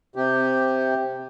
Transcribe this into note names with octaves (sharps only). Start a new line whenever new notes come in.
C3 G4